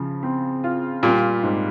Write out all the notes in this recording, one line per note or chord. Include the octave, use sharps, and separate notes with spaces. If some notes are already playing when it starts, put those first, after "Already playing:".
Already playing: C#3 F3
C4
F4
A#2 G3
G#2